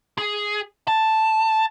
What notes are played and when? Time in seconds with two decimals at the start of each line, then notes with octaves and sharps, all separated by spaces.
0.18 G#4
0.88 A5